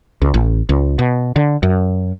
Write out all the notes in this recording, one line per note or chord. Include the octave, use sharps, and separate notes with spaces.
C#2
A1
C#2
B2
D3
F#2